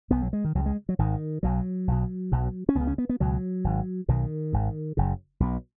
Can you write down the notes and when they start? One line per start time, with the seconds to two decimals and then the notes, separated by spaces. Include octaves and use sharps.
0.10 B1 B2 B3
0.22 F#3
0.33 G#3
0.44 D#3
0.55 C#2 C#3 F#3
0.66 G#3
0.89 F#3
0.99 G#1 G#2 D#3
1.43 B1 B2 F#3
1.88 B1 B2
2.32 B1 B2
2.69 C#4
2.75 C#2 B3
2.81 C#3
2.87 C#4
2.98 B3
3.09 B3
3.20 C#2 B2 F#3
3.64 G#1 G#2
4.08 B1 B2 D#3
4.53 G#1 G#2
4.97 F#1 F#2 C#3
5.40 B1 B2